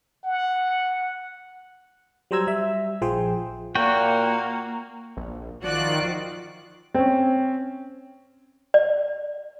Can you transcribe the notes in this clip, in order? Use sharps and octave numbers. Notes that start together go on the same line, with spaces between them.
F#5
F#3 G3 C5 A#5 E6 G#6
G3 E5
A#1 F3 G#4 C5 G5
A#2 A#3 F#4 F#5 G5
A#1
D#3 F3 F4 F#4 D5 F#6
C4 C#4
D5